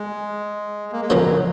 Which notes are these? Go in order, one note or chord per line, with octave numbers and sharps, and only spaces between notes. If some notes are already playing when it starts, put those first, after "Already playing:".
Already playing: G#3
A#3
G#3
C#3 F3 F#3 A#3 C#4